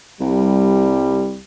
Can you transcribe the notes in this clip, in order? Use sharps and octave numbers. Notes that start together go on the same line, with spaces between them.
C2 G3